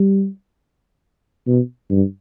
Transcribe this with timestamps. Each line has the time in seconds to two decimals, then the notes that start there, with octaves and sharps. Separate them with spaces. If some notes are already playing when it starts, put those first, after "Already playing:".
Already playing: G3
1.47 B2
1.90 G2